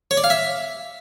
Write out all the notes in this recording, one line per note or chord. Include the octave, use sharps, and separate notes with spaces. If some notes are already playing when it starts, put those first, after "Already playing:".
C#5
D5
F5
E5